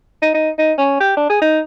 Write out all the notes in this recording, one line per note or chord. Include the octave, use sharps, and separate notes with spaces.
D#4
D#4
D#4
C#4
G4
D4
G#4
D#4